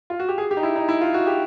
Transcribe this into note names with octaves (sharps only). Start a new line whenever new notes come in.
F4
F#4
G4
G#4
G4
D#4
E4
D#4
E4
F4
F#4
G4